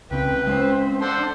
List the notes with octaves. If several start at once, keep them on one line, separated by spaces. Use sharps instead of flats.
C#2 C#3 C4 B4 G5
G#3 C4 C#4 C5
D4 A4 C5 F#5 C6